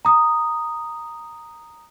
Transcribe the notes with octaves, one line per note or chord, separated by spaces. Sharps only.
A#5 D#6